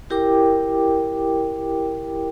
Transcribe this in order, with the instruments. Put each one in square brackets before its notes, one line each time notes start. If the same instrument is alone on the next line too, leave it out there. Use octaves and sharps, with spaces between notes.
[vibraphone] E4 G4 A#4 G5 D6